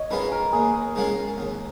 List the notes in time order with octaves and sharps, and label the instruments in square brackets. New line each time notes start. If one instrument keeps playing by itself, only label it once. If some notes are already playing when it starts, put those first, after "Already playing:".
Already playing: [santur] C#5 D#5
[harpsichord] D#3 G#3 C#4 F4 [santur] B4
[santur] A#4
[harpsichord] D#2 [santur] G#4
[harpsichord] D#3 G#3 C#4 F4
D#2